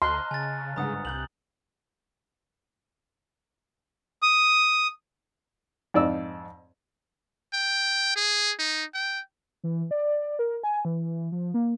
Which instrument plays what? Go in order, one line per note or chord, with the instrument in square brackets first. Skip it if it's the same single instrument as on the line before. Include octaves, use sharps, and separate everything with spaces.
[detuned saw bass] D2 [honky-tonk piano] D#5 A5 A#5 [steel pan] C6 [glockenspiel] F6 F#6
[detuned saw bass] C#3 [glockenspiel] G#5 A6
[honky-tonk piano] G1 G#2 F#5 [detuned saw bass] C#3 [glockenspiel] A#5 D#6
[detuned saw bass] C2 [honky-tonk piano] F#6 G6 F7 [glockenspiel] F#7
[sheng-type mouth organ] D#6
[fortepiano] F2 G#2 D5 D#5 E6
[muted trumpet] G5
G#4
D#4
G5
[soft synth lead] E3
D5
A#4
G#5
E3
F3
A#3